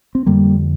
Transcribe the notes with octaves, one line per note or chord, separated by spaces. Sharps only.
C4
F2 D3 G3 A#3